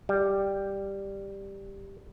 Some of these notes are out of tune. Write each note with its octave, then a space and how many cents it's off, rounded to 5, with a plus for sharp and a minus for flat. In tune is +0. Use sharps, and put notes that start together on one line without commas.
G3 +5